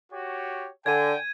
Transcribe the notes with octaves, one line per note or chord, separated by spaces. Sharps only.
F#4 G4 C#5
D3 G5 G#5 G#6 D#7